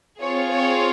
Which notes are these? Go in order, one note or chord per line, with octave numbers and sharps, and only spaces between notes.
C4 F4 G#4 C#5
C#5